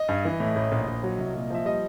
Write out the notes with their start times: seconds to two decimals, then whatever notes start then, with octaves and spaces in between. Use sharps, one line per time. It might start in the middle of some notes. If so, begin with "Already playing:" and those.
Already playing: D#5
0.09 G2
0.25 E3
0.40 A2
0.56 A1
0.72 A#1
0.88 A#1
1.03 F#3
1.18 C2
1.34 A#2
1.50 F3 E5
1.65 G3 D#5